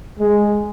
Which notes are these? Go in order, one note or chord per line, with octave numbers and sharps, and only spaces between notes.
G#3